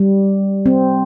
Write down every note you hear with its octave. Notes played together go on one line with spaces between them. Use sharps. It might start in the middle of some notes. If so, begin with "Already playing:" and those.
Already playing: G3
C4